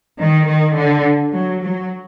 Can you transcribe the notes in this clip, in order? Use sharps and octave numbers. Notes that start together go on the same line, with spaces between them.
D#3
D#3
D3
F#3
F#3